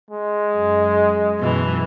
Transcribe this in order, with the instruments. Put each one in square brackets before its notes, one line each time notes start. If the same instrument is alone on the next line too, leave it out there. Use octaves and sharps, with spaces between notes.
[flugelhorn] G#3
[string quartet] F#2
F#2 B2 E3